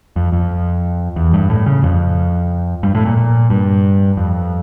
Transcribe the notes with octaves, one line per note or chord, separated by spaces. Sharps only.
F2
F2
E2
G2
A2
C#3
F2
G2
A2
A#2
A#2
G2
F2